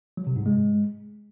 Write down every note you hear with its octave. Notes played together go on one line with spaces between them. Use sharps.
F#3
C3
G#2
G#3